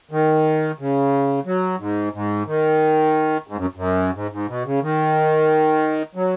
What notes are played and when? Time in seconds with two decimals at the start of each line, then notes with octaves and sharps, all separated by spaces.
0.11 D#3
0.79 C#3
1.46 F#3
1.79 G#2
2.13 G#2
2.47 D#3
3.47 G#2
3.57 F#2
3.76 F#2
4.14 G#2
4.31 G#2
4.48 B2
4.65 C#3
4.82 D#3
6.15 F#3